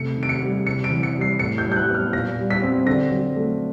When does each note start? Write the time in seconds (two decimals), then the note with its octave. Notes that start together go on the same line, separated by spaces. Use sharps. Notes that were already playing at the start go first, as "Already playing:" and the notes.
Already playing: C3 A3 C#7
0.17 D#3
0.23 D7
0.29 C#7
0.42 G3
0.66 C3 C#7
0.84 D7
0.90 E3
1.03 C#7
1.15 G3
1.21 C7
1.39 A2 C#7
1.58 G6
1.64 F#3
1.72 G6
1.76 F#6
1.89 B3
1.95 F6
2.13 A#2 A#6
2.37 G3
2.50 B6
2.62 C4
2.87 D3 A#6
3.11 F#3
3.36 A3